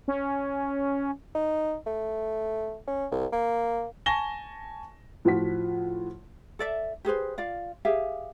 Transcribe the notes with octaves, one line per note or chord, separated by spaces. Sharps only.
C#4
D#4
A3
C#4
C2
A#3
G#5 A5 C#6 A#6 E7 G7
A2 F3 F4 F#4 F#5 B6
A4 D5 E5
G4 G#4 B4 C5
F4 D5 F5
G4 G#4 E5 F5